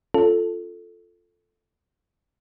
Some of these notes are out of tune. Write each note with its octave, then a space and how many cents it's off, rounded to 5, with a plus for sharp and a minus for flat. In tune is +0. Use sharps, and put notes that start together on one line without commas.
C#4 +0 F4 +0 A4 +0